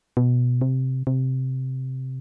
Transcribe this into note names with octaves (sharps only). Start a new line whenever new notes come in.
B2
C3
C3